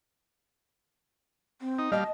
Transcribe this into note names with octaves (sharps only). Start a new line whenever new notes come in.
C4
D#4
G3 D#5 F5 A5